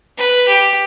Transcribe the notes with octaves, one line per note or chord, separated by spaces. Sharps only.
B4
G4